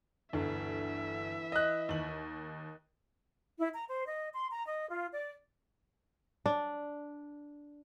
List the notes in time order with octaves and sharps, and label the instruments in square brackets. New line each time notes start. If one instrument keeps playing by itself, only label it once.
[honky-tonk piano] G1 D2 [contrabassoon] E3 [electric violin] E5
[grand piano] D#5 F#6
[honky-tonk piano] D#2 F#7
[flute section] E4
A#5
C5
D#5
C6
A#5
D#5
F4
D5
[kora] D4